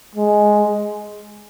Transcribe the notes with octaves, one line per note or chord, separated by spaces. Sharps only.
G#3